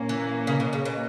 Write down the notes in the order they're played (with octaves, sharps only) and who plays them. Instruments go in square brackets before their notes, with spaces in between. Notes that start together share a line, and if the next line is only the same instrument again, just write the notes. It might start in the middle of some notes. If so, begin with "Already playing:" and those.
Already playing: [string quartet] A#2 A#3 C#4
[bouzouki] E3
C#3
B2
C#3
B2